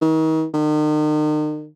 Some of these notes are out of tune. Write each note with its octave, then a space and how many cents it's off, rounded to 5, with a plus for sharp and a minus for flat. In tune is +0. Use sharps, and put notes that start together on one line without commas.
D#3 +40
D#3 -40